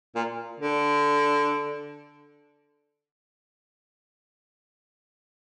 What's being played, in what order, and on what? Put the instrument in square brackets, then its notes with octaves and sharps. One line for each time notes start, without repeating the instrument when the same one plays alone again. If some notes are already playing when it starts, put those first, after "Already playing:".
[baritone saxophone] A#2
D3